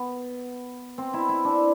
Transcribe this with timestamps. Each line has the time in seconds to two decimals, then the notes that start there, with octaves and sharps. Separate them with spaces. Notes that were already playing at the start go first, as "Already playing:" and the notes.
Already playing: B3
0.98 C4
1.14 E4
1.29 E4
1.45 D4